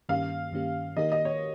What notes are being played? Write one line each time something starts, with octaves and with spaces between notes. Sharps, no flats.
G2 D#3 A#3 C#4 G4 F5
G2 D#3 A#3 C#4 G4
D#3 A#3 D#4 G4 A#4 D#5
D#5
C#5